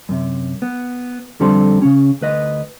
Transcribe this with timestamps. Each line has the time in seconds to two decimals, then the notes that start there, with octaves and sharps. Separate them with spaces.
0.09 F#2 C3
0.62 B3
1.40 F2 D3 G3 C4 A4 C6
1.82 C#3 C#4
2.21 D2 B4 D#5